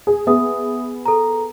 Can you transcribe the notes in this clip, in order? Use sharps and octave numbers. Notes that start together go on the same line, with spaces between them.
G#4
B3 G#4 E5 D#6
A4 A#5